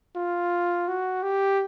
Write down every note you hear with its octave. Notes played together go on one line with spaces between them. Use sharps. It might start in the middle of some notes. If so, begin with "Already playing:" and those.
F4
F#4
G4